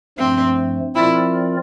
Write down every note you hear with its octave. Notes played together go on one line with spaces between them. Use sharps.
G2 F3 A3 C4
F3 C4 E4 F4 A#4 D5